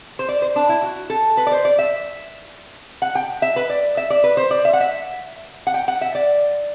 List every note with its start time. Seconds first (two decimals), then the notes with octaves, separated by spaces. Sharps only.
0.19 C5
0.29 D5
0.42 C5
0.56 D4
0.69 E4
0.83 F#4
1.10 A4
1.37 B4
1.47 D5
1.51 C5
1.65 D5
1.79 E5
3.02 F#5
3.15 G5
3.42 E5
3.56 B4
3.70 D5
3.97 E5
4.10 D5
4.24 B4
4.37 C5
4.51 D5
4.65 E5
4.73 F#5
4.80 E5
5.67 F#5
5.74 G5
5.88 F#5
6.01 E5
6.15 D5